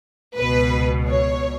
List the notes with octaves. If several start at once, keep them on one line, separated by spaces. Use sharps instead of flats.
B2 B4
C#2
C#5